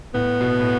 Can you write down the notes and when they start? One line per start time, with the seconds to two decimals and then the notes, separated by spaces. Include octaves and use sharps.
0.14 A2 B3
0.41 B2
0.60 A2